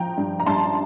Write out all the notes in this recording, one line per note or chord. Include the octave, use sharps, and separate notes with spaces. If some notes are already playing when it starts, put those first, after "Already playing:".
Already playing: F3 G5 A#5
G2
A#5
G2 A5 C6